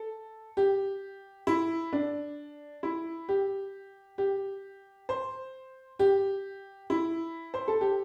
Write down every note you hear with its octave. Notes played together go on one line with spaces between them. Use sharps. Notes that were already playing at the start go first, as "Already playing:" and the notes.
Already playing: A4
G4
E4
D4
E4
G4
G4
C5
G4
E4
C5
A4
G4